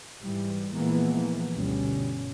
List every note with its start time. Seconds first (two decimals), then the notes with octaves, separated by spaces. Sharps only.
0.22 G#2 E3 G3
0.73 A#2 E3 F3 G#3 A#3 B3
1.54 G1 D2 B2 G3 C#4